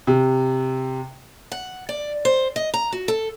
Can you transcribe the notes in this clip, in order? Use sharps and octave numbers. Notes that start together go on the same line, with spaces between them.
C3
F#5
D5
C5
D#5
A#5
F#4
A4